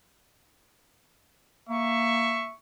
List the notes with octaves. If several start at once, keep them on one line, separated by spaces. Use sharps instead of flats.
A#3 E5 C#6